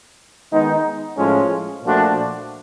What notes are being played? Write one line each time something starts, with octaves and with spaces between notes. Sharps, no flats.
D#3 G#3 B3 D#4
A2 F3 G#3 C#4 F4
A#2 F3 A3 D4 F#4